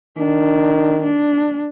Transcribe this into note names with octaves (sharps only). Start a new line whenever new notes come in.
D#3 D4
D4